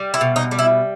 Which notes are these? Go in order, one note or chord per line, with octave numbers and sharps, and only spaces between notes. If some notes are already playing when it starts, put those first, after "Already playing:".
Already playing: G3
E4
B2
D#4
G3
E4